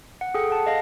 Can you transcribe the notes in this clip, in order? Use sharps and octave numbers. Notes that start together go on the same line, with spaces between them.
F#5
G#4 A4 G5 C#7
F#5 A5
D#5 F5 A#6